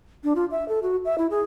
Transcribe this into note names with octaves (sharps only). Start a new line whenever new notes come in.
D4
F4
E5
A4
F#4
E5
E4
G#4